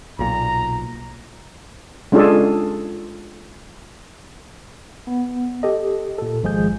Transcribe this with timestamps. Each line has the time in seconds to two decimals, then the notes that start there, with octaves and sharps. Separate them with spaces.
0.19 B1 A#2 A#5
2.12 G#3 C#4 D4 F4 G#4 A4
5.07 B3
5.63 G4 A4 D#5
6.18 A#2 A4
6.44 G#1 F3 G#3 G#4 G6